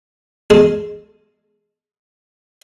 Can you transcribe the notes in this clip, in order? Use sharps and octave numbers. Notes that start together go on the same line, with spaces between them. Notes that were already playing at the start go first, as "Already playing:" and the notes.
G#3 G#4 A4